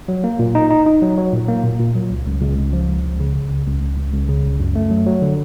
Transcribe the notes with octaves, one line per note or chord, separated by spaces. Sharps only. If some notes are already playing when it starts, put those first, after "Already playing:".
F#3
A#3
A#2
D#4
D#4
D#4
F#3
F#3
A#2
A#3
A#2
A#2
F#3
C#2
C#2
C#2
C#2
F3
C#2
C#2
C#3
C#3
C#2
C#2
C#2
C#2
C#2
C#3
C#2
F#2
A3
F#3
F#3
D3